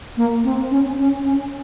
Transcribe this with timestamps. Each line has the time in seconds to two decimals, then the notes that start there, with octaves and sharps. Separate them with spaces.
0.17 A#3
0.44 C4
0.71 C#4
0.98 C#4
1.24 C#4